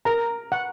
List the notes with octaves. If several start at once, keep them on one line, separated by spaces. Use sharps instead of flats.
A#4 A#5
F#5